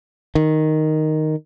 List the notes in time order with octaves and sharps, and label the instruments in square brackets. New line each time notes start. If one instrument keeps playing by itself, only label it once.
[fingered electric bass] D#3